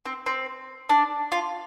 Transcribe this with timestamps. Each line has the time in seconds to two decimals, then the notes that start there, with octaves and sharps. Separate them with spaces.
0.06 C4
0.26 C4
0.89 D4
1.32 F4